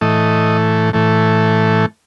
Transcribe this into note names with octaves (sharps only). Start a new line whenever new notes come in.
A2 E3 A3 D#5
A2 E3 A3